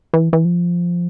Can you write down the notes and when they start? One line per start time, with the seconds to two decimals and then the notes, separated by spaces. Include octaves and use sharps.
0.13 E3
0.33 E3
0.45 F3